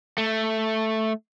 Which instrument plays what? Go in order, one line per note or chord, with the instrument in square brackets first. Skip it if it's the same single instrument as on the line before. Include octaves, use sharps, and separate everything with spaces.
[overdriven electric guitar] A3